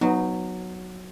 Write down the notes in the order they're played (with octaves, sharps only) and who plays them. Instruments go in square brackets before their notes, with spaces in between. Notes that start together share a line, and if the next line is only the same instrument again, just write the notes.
[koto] F#3 [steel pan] B3 D#4